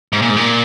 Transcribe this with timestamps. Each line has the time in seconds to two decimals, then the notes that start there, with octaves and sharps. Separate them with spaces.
0.13 G#2
0.22 A#2
0.29 G#2
0.36 A#2